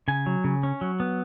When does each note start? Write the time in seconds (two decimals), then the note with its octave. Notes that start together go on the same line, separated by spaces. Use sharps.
0.08 C#3 G#5
0.26 F#3
0.44 C#3
0.63 C#4
0.81 F#3
1.00 B3